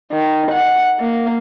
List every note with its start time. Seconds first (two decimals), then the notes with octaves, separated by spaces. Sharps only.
0.12 D#3
0.51 F#5
0.99 A#3